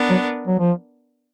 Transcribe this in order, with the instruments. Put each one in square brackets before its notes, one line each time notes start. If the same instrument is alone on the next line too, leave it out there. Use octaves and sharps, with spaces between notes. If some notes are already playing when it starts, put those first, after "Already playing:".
Already playing: [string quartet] B3 D4 A#4
[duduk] F#3
F#3
F3